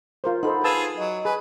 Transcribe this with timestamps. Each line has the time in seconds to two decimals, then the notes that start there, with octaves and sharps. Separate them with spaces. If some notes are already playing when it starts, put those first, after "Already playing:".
0.24 F4 A#4 C5
0.43 D#4 A4 C5 F#5 B5
0.64 F4 G#4 B4 A5 E6
0.97 F#3 D#5
1.25 G#4 B4